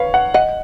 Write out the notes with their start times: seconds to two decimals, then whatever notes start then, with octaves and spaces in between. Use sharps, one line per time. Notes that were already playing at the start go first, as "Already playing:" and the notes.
Already playing: B4 C#5 F5
0.14 F#5
0.34 D#5 F#5